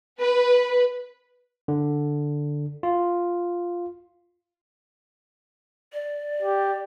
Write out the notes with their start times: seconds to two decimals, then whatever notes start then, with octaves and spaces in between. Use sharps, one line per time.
0.19 B4
1.68 D3
2.83 F4
5.93 D5
6.42 G4